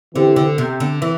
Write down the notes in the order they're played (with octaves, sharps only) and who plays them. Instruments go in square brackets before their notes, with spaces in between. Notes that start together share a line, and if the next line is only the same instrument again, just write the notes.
[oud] D3 [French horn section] E3 C4 G4
[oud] D3
C3
D3
E3